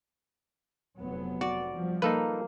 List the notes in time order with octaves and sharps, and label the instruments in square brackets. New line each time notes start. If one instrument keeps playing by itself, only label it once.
[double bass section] F1 F#3 B3
[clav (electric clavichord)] F#4 [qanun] D5
[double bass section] F3 G3
[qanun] A#3 [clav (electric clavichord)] D#4 A4 B4